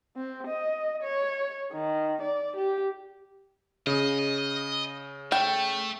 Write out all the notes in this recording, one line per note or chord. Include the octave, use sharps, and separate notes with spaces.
C4
D#5
C#5
D#3
D5
G4
C#3 D#5
A3 G5